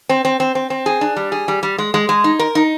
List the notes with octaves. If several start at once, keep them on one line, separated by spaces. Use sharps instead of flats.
C4
C4
C4
C4
C4
G#4
D4
G3
G#4
G3
G3
G#3
G#3
G#3
D#4
A#4
D#4